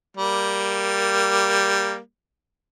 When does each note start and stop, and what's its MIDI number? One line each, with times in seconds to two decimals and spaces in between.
0.17 1.98 55
0.17 1.98 58